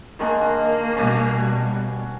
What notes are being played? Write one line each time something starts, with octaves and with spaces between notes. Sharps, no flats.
D#3 G#3 A#3 D4
B2 G3 C#4 D4 F#4